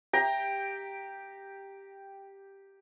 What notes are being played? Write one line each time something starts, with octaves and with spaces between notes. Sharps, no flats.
G4 G5 A#5